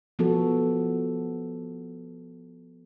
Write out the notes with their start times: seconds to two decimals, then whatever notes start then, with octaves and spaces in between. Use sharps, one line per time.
0.19 F3 B3 F#4 A4